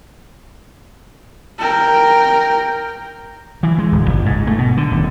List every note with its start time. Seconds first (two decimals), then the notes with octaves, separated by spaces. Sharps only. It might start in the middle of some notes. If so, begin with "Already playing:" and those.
1.59 A#4 G5
3.63 E3
3.78 G#3
3.92 D1
4.09 G1
4.26 G#2
4.47 A3
4.58 B2
4.77 D3
4.91 D#1